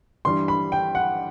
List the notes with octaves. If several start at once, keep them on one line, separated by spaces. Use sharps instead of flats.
G2 E3 G3 C6
B5
G5
F#5